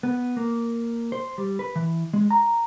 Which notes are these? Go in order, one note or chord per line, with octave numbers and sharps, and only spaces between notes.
B3
A#3
C5
G3
B4
E3
G#3
A#5